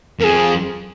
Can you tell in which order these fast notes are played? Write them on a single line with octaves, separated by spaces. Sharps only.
F2 A#4 G#4